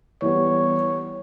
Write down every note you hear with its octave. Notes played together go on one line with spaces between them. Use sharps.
E3 G3 B3 C#5